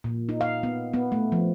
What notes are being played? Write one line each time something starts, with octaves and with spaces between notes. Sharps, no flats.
A#2
D#4
F5
B3
B3
A3
F3